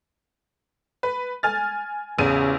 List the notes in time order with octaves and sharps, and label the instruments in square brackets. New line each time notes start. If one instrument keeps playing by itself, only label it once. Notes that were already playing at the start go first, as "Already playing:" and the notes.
[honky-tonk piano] B4
G#5 F6 A6
[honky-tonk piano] A1 E2 D#7 [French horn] C#3